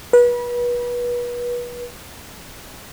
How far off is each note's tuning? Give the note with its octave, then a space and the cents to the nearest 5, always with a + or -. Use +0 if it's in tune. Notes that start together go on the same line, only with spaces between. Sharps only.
B4 -30